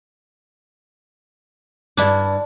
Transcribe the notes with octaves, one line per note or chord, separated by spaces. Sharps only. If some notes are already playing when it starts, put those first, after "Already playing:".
G2 G3 D4 E4